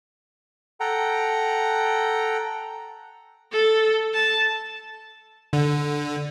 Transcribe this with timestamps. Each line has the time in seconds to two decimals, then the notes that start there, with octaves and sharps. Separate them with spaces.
0.80 A4 F#5 G5 A#5
3.52 A4
4.14 A5
5.53 D3